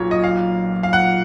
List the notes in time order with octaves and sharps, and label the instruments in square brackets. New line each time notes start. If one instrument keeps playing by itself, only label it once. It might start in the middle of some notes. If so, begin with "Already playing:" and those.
Already playing: [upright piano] B1 A#2 [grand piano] C#5
[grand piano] D#5
F5
F5
F#5